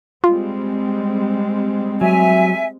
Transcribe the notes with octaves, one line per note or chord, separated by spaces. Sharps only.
G3 G#3 C4 F4
F#3 E5 G#5